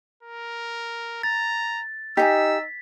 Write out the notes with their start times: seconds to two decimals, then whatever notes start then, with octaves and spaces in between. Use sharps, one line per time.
0.23 A#4
1.23 A#5 A6
2.17 D#4 G4 D#5 G#5 E6 B6